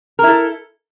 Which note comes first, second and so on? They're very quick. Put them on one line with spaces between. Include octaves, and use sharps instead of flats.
A#4 E4 A4